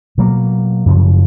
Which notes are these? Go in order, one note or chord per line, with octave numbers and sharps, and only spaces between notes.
B2 F#3 A#3
F#2 C#3 F3